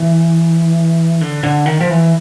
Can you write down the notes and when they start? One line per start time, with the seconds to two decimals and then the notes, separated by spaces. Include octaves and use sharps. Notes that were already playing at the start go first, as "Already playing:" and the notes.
Already playing: E3
1.21 D3
1.43 D3
1.66 D#3
1.81 F3
1.90 E3